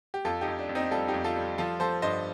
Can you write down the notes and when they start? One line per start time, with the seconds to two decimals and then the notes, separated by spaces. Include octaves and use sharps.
0.14 G4
0.25 F2 F4 A4
0.41 D#4 G4
0.47 F2
0.59 D4
0.69 F2
0.75 C4 D#4
0.91 G3 F4 A4
1.08 D#4 G4
1.14 F2
1.24 F4 A4
1.36 G3
1.58 F3 F4 A4
1.80 F3 A4 C5
2.02 G2 C5 D#5